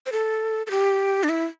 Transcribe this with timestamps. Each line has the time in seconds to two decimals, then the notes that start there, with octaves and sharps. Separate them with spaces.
0.06 C5
0.12 A4
0.66 A4
0.71 G4
1.24 D4
1.29 E4